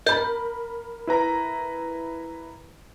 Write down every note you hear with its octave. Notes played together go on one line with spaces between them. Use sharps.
A#4 D#5 B5 G6
E4 B4 A#5